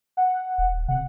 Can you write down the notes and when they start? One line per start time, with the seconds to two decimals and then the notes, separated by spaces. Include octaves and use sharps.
0.17 F#5
0.58 D#1
0.88 C3 F#5